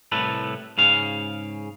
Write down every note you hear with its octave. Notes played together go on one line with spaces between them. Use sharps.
C2 A2 A4 B4
G#2 C#3 F5